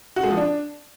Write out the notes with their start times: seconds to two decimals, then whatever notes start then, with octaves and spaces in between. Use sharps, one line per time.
0.16 F#4
0.23 G#3
0.30 F3
0.37 D4